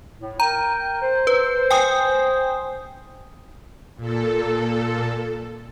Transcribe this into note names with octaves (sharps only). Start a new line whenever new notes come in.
A2
A#4 G5 A#5
C5
B4
G5 G#5 D#6
A#2 A4